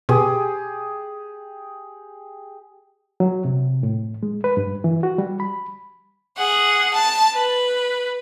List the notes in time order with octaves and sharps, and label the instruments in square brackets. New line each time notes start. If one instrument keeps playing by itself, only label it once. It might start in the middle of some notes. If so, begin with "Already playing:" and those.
[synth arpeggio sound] B2 [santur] G4 G#4 D#6
[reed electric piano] F#3
C3
A2
G#3
B4
G2
E3
F#4
G3
B5
[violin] G#4 F#5
A5
B4